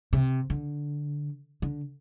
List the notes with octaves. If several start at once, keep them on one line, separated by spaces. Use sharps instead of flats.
C3
D3
D3